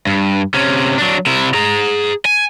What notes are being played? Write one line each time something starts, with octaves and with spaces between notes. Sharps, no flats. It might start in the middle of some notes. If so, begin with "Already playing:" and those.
G2
C3 C#4
F#3 D4
C3 E4
G#4 A#5
G#5